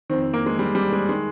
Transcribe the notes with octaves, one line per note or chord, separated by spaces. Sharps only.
F2 D#3 C4
C4
A#3
G#3
G3
G3
G#3
D#3 G#3